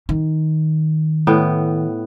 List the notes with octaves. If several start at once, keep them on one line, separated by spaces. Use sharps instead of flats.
D#3
A2 B3 G5